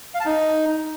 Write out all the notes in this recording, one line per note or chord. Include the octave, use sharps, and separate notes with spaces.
F5
A5
D#4